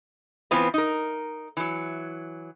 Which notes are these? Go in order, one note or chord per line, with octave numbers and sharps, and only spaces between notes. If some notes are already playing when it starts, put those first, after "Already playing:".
E3 B3 C4 F4 B4
D#4 A#4
E3 F#3